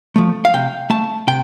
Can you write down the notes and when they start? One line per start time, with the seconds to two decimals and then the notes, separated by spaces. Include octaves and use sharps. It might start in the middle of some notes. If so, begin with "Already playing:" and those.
0.16 F3 A3
0.45 F5
0.54 C3 G5
0.90 A3 A5
1.27 C3 G5